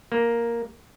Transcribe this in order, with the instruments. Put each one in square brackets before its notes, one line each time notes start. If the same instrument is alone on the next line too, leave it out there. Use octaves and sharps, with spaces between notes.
[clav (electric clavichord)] A#3